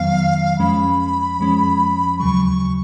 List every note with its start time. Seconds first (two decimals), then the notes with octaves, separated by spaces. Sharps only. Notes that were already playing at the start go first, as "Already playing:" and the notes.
Already playing: F2 D#3 F#3 B3 F5
0.59 F2 F3 G#3 C#4 B5
1.40 F2 F3 G#3 C#4
2.19 D#2 C#3 F#3 C#6
2.45 C#6